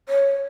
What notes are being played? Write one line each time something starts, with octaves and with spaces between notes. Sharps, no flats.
C#5